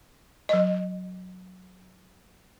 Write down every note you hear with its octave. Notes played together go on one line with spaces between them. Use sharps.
F#3 D#5